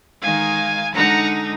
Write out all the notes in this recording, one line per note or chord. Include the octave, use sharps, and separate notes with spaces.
D#3 G#3 D#4 F5 G#5
D3 G#3 D#4 F#5 A#5